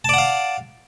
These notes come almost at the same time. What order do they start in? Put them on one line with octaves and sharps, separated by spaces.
A5 D5 F#5 F5